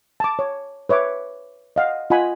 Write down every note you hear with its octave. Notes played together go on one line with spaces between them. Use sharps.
A5 D6
C#5
B4 C#5 E5 D6
D#5 F5 F#5
F4 D#5 F#5 G#5 B5